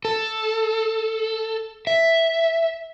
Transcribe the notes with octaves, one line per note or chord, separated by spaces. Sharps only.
A4
E5